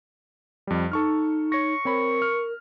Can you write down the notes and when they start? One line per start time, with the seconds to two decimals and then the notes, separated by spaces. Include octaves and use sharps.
0.67 F2 G3
0.92 D#4 A4 C#6 F6
1.52 C#5 C#6 A#6
1.85 C4 A#4 C#5 B5
2.22 F6